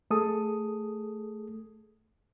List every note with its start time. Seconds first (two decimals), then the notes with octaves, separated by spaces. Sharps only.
0.10 A3 G#4 A4 D#6